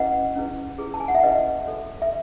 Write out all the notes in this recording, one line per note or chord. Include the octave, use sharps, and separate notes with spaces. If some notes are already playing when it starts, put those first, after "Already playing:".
Already playing: C#4 E4 G#4 B4 D#5 F#5
C#4 E4 G#4 B4
C#4 E4 G#4 B4
A5
G#5
F#5
E5
C#4 E4 G#4 B4 D#5
F#4 A4 C#5
E5